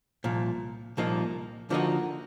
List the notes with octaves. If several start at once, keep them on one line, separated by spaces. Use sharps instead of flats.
C2 A#2 F3
C2 A#2 F3 A#3 D#4
D3 F3 A#3 D#4 F#4